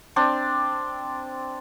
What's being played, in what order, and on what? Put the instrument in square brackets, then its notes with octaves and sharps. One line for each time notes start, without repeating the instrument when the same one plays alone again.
[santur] C4 D4